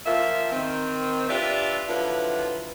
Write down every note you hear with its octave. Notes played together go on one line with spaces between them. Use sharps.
F3 A#3 E5
D#3 C4
D4 F4 G4 B4 D5 E5
D3 F3 F#3 E4 F4 B4